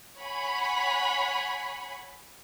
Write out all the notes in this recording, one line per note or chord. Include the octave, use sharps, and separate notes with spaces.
C#5 F#5 G#5 B5